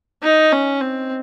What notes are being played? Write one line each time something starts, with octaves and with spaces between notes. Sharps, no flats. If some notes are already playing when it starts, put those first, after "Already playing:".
D#4
C#4
C4